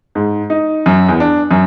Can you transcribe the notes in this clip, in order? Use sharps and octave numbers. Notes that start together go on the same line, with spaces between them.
G#2
D#4
F#2
E2
D4
F#2